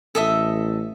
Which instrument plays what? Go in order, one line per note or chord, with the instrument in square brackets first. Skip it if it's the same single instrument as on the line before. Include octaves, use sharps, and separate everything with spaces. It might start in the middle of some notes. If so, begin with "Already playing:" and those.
[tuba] A1 [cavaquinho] A4 D#5 E5